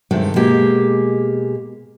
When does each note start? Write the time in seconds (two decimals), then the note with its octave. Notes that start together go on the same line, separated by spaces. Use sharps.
0.11 G2 C3 D#3 G#3 A3
0.36 B2 G#3 A#3 G4 G#4